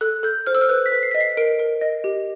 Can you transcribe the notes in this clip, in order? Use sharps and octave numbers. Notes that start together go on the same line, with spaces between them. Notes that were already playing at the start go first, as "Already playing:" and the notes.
A4 F#6
A4 G6
C5 F6
E6
F6
B4 F#6
B6
B4
C7
B6
D#5
C7
A#4 D7
A#4
D#5
G4